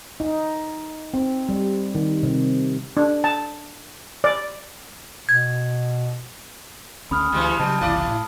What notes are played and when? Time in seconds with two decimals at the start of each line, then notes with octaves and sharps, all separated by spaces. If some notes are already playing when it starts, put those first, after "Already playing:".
0.20 D#4
1.14 C4
1.49 G3
1.95 D#3
2.23 C3
2.97 D4
3.24 A5
4.24 D5
5.29 B2 G#6
7.11 D2 C#4 B5 D#6 F6
7.32 D2 E3 G3 G#3
7.59 C#3 F#3 G3 A5
7.81 F#1 C2 E3 E4 D5
8.07 A2